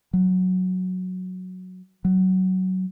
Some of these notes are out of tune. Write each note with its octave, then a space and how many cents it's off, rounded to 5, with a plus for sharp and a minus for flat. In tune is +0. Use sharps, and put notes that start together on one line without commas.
F#3 -5
F#3 +15